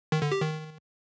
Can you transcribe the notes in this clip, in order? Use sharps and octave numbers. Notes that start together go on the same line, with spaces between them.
D#3
D3
G4
D#3